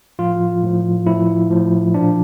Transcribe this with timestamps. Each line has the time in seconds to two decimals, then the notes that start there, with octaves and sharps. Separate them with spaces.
0.19 A2 F3 F4
0.63 A2 F3
1.06 A2 F3 E4
1.51 A2 F3
1.94 A#2 F3 D4